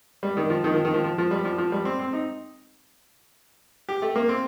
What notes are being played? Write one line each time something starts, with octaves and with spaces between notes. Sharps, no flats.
G3
D#3
F3
D#3
F3
D#3
F3
F3
F3
G3
F3
F3
G3
C4
C4
D#4
G4
A3
A#3
C4